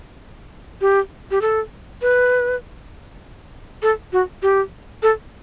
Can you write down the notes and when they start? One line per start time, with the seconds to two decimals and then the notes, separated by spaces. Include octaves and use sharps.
0.81 G4
1.31 G4
1.42 A4
2.02 B4
3.82 A4
4.13 F#4
4.42 G4
5.03 A4